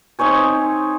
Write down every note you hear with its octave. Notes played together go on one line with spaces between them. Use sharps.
C4 D#4 C#5 G#5